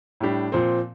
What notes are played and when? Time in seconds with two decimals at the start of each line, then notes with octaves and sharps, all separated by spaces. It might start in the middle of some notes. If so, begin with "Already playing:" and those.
0.20 A2 G3 D4 G4
0.52 A#2 F3 C4